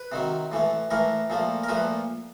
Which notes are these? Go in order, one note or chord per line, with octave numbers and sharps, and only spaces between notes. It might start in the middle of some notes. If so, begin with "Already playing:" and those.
Already playing: B4
C3 D#3 F#3
A2 E3 A3
A2 E3 A3 A#4
A#2 F3 A3
A#4
A#2 F3 A3 B4